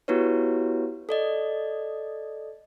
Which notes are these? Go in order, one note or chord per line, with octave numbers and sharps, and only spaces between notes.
B3 E4 F#4 G4 B4 C#5
A4 D5 D#5